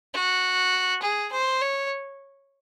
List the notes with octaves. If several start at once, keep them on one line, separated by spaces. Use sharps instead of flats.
F#4
G#4
C5
C#5